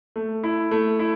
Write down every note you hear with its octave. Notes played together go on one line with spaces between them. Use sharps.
A3
E4
A3
E4